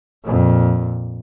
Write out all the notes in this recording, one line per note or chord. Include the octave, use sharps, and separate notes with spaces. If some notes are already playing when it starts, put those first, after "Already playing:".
F2 A#2